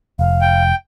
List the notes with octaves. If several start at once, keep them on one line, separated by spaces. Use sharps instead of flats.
F1 F5
G5